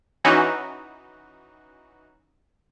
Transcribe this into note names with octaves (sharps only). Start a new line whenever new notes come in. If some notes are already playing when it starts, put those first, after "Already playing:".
E3 C#4 D#4 F#4